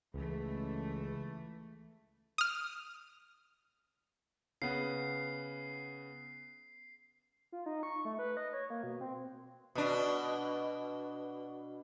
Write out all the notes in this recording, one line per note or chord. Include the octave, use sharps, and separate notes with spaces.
C#2 E3 A3
D#6 F6
C#3 B3 C7
F4
D#4
C#6
A3
B4
D#5
C#5
A#3
B2
C4
B2 D4